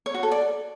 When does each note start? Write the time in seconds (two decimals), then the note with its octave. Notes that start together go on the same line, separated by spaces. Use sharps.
0.06 C#5
0.14 F#4
0.23 A4
0.31 D5